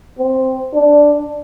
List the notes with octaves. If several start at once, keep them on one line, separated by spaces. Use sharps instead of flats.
C4
D4